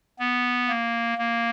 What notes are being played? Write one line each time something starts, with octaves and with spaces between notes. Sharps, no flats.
B3
A#3
A#3